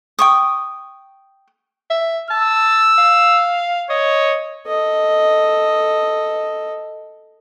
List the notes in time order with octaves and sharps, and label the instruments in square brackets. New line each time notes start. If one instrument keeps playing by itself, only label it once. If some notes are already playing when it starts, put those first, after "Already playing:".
[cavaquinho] G5 C#6 D#6
[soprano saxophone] E5
[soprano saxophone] A5 [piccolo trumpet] E6
[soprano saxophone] F5
[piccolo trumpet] C#5 [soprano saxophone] D#5
[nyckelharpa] A4 D#5